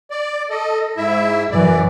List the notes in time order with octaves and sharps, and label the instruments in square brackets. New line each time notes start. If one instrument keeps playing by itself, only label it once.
[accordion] D5
A4 D#5
G#2 E4 E5
[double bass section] F#2 E3 [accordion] D5